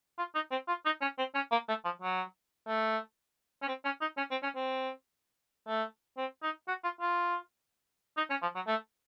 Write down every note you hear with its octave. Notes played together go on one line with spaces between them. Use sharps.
F4
D#4
C4
F4
D#4
C#4
C4
C#4
A#3
A3
F3
F#3
A3
C#4
C4
C#4
D#4
C#4
C4
C#4
C4
A3
C4
D#4
F#4
F4
F4
D#4
C#4
F3
F#3
A3